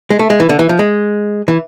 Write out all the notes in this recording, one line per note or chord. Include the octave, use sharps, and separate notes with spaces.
G#3
A3
G#3
E3
D3
E3
F3
G#3
E3